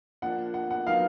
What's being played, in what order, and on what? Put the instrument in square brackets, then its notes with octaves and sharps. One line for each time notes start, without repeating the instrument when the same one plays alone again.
[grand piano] F3 A#3 D4 [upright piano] F#5
[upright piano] F#5
F#5
[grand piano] F#3 B3 D#4 A#4 [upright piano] F5